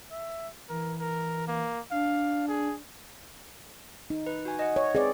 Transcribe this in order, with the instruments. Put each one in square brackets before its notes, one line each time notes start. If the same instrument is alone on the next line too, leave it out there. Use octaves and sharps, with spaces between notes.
[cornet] E5
[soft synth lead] E3 [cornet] A#4
[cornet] A#4
A#3
[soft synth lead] D4 [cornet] F5
[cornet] G#4
[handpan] D#4
[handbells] B4
F#4 G#5
D#5 F#5
[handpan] C#5
[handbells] C4 [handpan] G#4 B4 D5